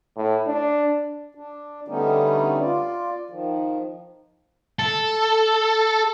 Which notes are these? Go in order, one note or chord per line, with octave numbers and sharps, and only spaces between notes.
A2
D4
D4
D3 G3 A3 B3 C#4 D#4
F4 D5
D#3 F3
A4